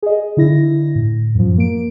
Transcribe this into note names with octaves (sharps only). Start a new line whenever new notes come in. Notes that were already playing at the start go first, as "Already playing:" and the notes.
G#4 D#5
D3 E4 A#6
A2
F#2 F3
A#3 D7